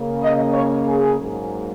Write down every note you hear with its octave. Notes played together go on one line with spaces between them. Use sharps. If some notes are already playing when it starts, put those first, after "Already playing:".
Already playing: C#3 A#3
D#5
C#5
G#4
G#2 F#3 A#3